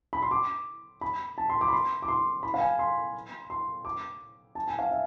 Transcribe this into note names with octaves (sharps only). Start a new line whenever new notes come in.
B5
C6
D6
B5
A5
C6
D6
B5
C6
D6
C6
B5
F5
G#5
C6
C6
D6
A5
G#5
F5
E5